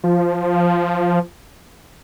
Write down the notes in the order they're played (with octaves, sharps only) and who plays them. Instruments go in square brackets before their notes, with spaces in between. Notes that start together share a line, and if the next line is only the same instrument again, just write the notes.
[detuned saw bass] F3